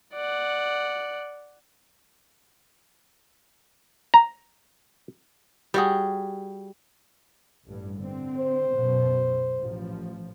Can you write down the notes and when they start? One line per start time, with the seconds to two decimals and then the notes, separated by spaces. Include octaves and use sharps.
0.13 D5 F#5
4.14 A#5
5.74 G3 F#4 G#4
7.66 A1 G2
7.97 D3 C4
8.38 C5
8.71 F#2 B2
9.61 A1 F3